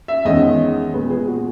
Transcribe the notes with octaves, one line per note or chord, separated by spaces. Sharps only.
E5
E2 D#3 G#3 C#4 D#5
A#2 G#3 B3 B4
G#4
F#4